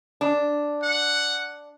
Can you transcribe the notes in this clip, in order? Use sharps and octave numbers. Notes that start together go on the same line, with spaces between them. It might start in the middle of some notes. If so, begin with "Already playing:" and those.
D4
F#5